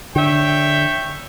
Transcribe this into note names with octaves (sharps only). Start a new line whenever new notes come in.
D3 C#5 E5 G5